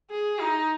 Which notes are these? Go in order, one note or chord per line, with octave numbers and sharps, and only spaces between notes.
G#4
D#4